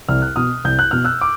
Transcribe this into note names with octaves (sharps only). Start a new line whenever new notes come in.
C2 F6
F#6
B2 D#6 F6
C2 G6
F#6
B2 F6
E6 F#6
D6